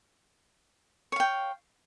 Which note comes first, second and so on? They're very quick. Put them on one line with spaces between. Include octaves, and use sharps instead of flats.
C#5 F5 G5